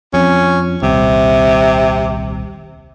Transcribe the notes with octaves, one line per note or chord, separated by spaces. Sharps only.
F2 C#4
D#1 C2 C3